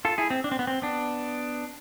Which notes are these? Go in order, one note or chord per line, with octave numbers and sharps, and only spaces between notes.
F4 A4
E4 G#4
C4
D4
C4
B3
C4
B3 D4